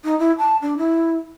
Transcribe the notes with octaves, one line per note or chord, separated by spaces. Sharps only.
D#4
E4
A5
D4
E4